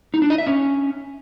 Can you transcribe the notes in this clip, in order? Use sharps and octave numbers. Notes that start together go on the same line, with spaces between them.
D#4
D4
D#5
E5
C#4